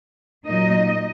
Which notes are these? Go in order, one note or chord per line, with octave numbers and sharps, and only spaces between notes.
A#2 F#3 A#3 D#4 D#5